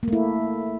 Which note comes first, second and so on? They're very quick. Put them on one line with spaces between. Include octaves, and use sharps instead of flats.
A#3 A3 E4